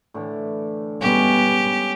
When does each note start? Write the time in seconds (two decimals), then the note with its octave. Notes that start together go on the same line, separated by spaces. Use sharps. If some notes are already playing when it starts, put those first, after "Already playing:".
0.14 A2 D3 E3
1.01 G#2 G3 B3 C#4 G4